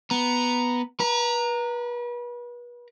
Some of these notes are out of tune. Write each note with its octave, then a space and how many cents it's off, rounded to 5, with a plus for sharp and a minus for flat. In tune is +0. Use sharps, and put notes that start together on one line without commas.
B3 +0 A#5 +0
B4 -35 A#5 -5